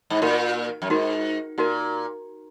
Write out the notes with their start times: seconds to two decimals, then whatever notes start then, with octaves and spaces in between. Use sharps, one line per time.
0.10 G#2
0.22 A#2 D#4 F#4 A#4
0.82 F#2
0.90 G#2 D#4 F#4 A#4
1.58 A#2 D#4 F#4 A#4